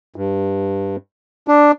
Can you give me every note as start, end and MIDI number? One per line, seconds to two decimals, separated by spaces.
0.16 0.96 43
1.48 1.71 62